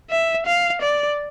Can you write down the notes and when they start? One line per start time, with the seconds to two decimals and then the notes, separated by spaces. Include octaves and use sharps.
0.10 E5
0.46 F5
0.81 D5